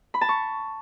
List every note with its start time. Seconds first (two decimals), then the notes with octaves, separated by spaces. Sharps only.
0.14 B5
0.21 A5
0.29 C#6